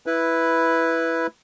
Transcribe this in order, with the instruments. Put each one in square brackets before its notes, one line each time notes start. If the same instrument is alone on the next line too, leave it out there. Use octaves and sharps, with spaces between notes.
[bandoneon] E4 B4